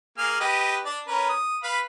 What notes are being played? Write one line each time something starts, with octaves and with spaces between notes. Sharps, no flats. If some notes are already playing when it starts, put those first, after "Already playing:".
A#3 G#4 F6
G4 B4 D#5
D4 D5
C#4 A#4 B4
D#6
B4 F5 B5